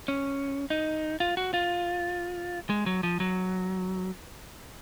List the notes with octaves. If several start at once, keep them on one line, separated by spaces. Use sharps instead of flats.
C#4
D#4
F4
F#4
F4
G#3
F#3
F3
F#3